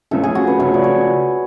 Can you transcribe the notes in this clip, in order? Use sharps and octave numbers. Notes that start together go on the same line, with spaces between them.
C#2 C#3 F3 A3 A4
G#4
F#4
B4
C#2 C#3 F3 A3 C#5
D5
C#5